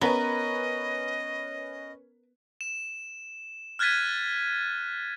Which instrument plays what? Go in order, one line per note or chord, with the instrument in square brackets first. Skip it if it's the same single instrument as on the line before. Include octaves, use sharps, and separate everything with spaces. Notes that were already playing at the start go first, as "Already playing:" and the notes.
[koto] B3 [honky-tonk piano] C#4 B4 [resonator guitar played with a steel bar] A#4 [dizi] D#5
[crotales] E7
F6 F#6 G#6 A6 B6 D#7